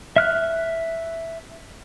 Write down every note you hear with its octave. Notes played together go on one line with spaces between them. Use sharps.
E5 F6 F#6